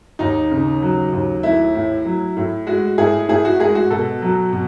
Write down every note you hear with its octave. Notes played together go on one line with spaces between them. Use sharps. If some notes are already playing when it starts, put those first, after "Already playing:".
D#2 D#4
C#3
F#3
D#2
A3 E4
A2
F#3
A2
G#3 F#4
A2 G#4
A2 G#4
F#4
G#3 G#4
F#4
B2 A4
F#3
B2